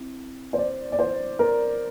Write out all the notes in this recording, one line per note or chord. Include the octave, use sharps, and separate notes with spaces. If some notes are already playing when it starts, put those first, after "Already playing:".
Already playing: C4 E4
C5
D5
D5
C5
A#4